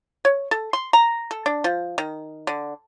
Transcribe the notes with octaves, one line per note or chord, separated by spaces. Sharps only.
C#5
A4
C6
A#5
A4
D4
F3
D#3
D3